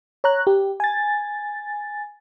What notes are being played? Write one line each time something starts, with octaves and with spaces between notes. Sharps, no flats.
C#5 A#5 F#6
G4
G#5 A6